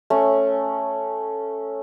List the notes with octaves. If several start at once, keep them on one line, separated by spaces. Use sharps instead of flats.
A3 C#4